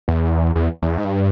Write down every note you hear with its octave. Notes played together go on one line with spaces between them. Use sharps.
E2
E2
E2
G#2
G2